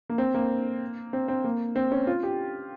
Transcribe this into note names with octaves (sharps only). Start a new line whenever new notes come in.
A#3
C4
A#3
C4
C4
A#3
C4
C#4
F4
G4